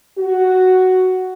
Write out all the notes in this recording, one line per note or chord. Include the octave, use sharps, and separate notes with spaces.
F#4